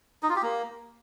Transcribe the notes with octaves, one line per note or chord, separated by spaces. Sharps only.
D#4
F4
G4
A#3